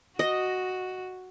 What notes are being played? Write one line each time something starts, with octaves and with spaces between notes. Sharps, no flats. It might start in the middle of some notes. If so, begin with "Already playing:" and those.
F#4 D#5